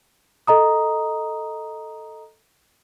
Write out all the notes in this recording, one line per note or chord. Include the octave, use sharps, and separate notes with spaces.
A4 D#5 A#5 D#6